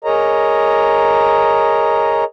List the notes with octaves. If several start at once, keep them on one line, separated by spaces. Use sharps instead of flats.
G#4 A#4 C#5 D#5 A#5